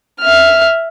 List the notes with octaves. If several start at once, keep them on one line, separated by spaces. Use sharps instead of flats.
E5 F6